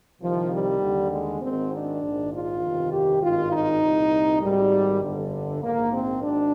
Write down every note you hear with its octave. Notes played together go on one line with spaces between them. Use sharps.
C2 C3 D#3 F3
G3
D#2 D3
G#3
G#1 G#2 D#3 C4
D4
A#1 G#2 D#3
F4
G1 F2 C3 D#3
G4
G#1 G2 D#3 F4
D#4
C2 A#2
G#1 G#2 D#3 G3
G1 F2 D3
A#1 G#2 D#3 A#3
C4
G#1 G#2 D4